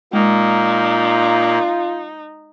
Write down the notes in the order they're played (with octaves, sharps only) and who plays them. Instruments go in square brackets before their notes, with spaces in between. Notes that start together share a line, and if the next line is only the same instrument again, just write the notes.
[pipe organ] A#2 A#3 [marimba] G#3 [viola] D#4 [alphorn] F4